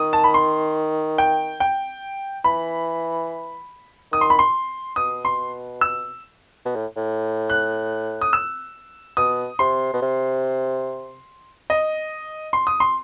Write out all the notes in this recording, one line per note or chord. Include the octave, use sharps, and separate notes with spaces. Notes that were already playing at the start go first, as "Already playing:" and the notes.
Already playing: D#3 D#6
A5
B5
C6
G5
G5
E3 B5
D#3 D#6
C6
B5
C6
B2 D#6
C6
E6
B2
A2
A2
F#6
D#6
E6
B2 D#6
C3 C6
B2
C3
D#5
C6
D#6
C6